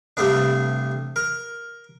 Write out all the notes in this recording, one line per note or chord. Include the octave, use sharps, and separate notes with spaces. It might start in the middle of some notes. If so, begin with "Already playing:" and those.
G2 C3 A3 B3 D4
A#4